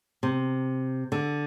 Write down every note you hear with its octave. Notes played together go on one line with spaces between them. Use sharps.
C3
D3